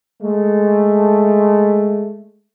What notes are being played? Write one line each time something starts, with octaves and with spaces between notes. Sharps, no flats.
G#3 A3